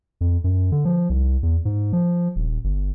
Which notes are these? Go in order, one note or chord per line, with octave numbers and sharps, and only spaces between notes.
F2
F#2
D3
F3
C2
E2
G#2
F3
D#1
G1